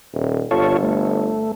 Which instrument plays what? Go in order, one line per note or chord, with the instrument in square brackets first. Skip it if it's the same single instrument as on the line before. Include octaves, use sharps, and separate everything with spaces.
[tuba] D#1
[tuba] G1 [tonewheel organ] F4 A4 C#5
[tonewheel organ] A3